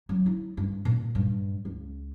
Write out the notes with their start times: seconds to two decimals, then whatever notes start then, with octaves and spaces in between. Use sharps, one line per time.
0.09 F#3
0.26 E4
0.57 G2
0.85 A#2
1.15 G2
1.65 C#2